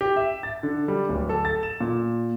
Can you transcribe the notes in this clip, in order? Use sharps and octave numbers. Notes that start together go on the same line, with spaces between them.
G4
E5
A6
D3
G3
D1
A4
A6
E7
A#2